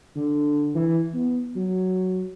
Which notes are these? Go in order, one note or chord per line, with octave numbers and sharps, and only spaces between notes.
D3
E3
B3
F#3